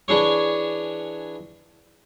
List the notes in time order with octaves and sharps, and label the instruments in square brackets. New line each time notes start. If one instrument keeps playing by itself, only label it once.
[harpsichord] E3 D4 G#4 C#5